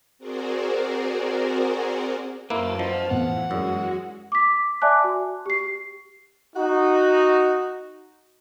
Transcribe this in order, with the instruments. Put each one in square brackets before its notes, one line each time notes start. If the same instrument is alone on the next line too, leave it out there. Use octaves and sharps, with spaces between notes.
[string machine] C4 F#4 G#4 A#4 C5 D5
[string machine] F#2 A5 A6 [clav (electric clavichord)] A#3 E4 [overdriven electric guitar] B4 C5
[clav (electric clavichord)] F3 [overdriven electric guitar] B4 D#5 [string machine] F5
[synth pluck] F2 A2 B3 [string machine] E3 [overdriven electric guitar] F#5
[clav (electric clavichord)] F#2 [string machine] G#3 F#4 [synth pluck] G#4 D5 E6
[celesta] D6 B6
D5 E5 G#5 A5 D6 F#6
F#4
G4 C7
[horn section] D#4 F#4